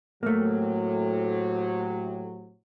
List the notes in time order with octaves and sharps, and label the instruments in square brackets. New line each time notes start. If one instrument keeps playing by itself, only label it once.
[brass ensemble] A2 C3 F#3 [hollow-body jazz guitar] A3 A#3